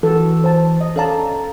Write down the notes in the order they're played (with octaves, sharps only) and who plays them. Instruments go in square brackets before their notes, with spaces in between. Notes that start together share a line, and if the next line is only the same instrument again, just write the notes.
[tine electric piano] E3 [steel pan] F#4 A4
[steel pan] C5 A5
D#5
[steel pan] C#4 D5 A5 [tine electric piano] A4 F5 A#5